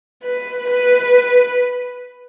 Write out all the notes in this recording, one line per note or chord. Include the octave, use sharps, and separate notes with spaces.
B4
B4